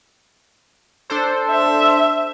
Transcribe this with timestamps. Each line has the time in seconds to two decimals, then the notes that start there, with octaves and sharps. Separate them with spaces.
1.10 D4 A4 C5
1.51 E5